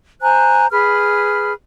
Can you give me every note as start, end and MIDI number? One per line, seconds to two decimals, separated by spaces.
0.21 0.66 72
0.21 0.66 80
0.21 0.66 82
0.21 0.66 90
0.70 1.52 68
0.70 1.52 71
0.70 1.52 83
0.70 1.52 89